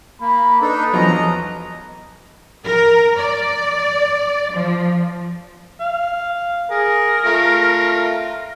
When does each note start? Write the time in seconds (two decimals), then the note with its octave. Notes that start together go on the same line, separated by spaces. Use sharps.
0.21 A#3 B5
0.62 D4 D#4 A4 B4
0.93 E2 F3 F#3 D#5 A#5
2.65 A#4
3.18 D5
4.53 F3
5.81 F5
6.71 G#4 A#4
7.25 A3 F4